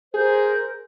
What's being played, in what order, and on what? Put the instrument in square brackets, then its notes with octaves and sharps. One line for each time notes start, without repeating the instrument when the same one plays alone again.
[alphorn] G#4 [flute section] A#4 C5 G6